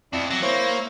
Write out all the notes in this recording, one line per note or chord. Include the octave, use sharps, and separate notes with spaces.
F2 E4 D5
F#3 D6
A#3 E4 C5 C#5